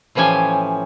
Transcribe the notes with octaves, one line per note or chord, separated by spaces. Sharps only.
A2 E3 F3 C#4 G4 G#5